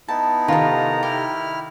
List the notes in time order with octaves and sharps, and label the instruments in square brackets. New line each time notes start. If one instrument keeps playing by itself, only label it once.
[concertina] B3 D#4 E4 [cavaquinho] A5
[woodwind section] C3 A4 A#5 [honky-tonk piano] D#3 [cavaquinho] F4 A5
[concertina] E4 F6 [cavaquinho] G4